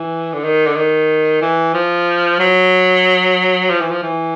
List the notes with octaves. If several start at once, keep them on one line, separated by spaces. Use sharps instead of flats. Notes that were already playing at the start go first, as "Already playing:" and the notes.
Already playing: E3
D3
D#3
D3
D#3
E3
F3
F#3
F3
E3
F3
E3